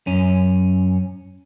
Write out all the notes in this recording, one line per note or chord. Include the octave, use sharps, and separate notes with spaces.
F#2 C#4